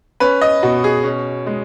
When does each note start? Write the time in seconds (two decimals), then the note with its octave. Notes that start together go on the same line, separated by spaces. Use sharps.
0.20 C#4 B4
0.41 D#5
0.63 B2 F#4
0.84 G#4
1.04 C#4
1.47 G#3